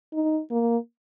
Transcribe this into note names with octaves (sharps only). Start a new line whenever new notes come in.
D#4
A#3